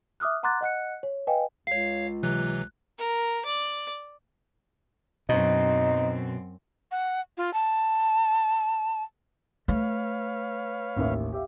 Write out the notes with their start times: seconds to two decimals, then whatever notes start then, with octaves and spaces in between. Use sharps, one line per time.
0.20 E5 D6 D#6 F6 F#6
0.43 F#5 A#5 C6 D6 F#6 A6
0.61 D#5 F#5 F#6 C#7
1.03 C#5
1.27 B4 D#5 F5 G5 G#5
1.67 C#2 C#5 F5 C7
2.23 C3 E3 F#3 F#6
2.98 A#4
3.45 D5
5.29 F#2 B2 C4 D#4
6.91 F#5
7.37 F4
7.54 A5
9.68 A3 B4 C#5 F5
10.96 A1 D#2 E5
11.33 G4 E5 F5